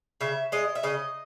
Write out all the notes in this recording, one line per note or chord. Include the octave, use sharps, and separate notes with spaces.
C#3 E5
G#3 D#5
E5
C#3 D#5